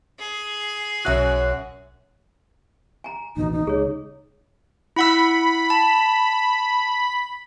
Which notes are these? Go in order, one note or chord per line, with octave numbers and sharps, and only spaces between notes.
G#4
B1 F#2 B2 F#4 E5 F#6
G#5 A#5
A1 D#2 B2 D#4
D#4
C#2 G#4 C#5
E4 F#5 B5 E6
A5